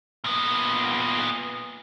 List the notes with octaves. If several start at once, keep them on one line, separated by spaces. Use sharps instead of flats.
A#2 B3